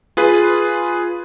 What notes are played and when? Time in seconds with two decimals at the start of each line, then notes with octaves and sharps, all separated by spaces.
0.17 F4 G#4 B4